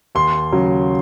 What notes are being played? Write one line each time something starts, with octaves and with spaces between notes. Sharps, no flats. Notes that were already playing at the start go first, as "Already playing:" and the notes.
D#2 C6
C#3 F#3